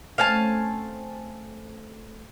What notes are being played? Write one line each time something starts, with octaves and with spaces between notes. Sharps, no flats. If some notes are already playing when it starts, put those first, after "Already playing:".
A3 C4 C#4 F5 G#5 A5